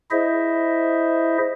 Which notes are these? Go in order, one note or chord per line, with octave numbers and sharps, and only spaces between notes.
E4 G#4 C5 D#5 E5